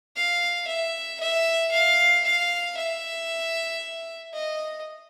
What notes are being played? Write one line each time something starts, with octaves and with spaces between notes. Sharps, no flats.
F5
E5
E5
F5
F5
E5
D#5